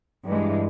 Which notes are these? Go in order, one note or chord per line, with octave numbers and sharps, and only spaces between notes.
G2 E3 G#3